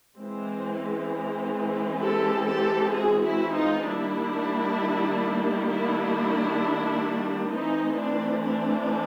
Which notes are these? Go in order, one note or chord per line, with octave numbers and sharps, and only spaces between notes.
E3 G#3 C4
G4 A4
G4 A4
F#4 G#4
E4 F#4
D#4 F4
D#3 G3 A#3 D4 E4
D4 E4
E3 A3 C4 D#4
D4
D4